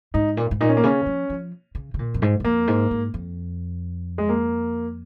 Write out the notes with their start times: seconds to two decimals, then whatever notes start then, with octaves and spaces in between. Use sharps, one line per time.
0.14 G#2 D#4
0.37 A#2
0.51 G#2
0.61 A#2 D#4
0.69 C#4
0.77 A#3
0.83 C#3 C#4
1.06 F3
1.30 F3
1.75 C#3
1.94 C#3
1.99 A#2
2.14 F2
2.22 G#2
2.40 G#2
2.45 F2 A#3
2.68 G#2
2.91 G#2
3.14 F2
4.18 G#3
4.29 A#3